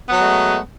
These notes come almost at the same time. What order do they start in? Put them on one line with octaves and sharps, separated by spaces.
B3 F#3 G#3 A3